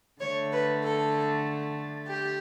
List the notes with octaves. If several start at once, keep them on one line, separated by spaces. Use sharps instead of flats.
D3 A3 C#5
B4
A4
G4